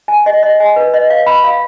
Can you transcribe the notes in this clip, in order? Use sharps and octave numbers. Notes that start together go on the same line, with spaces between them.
G#5
D#5
D#5
G#5
B4
D#5
F5
B5
F5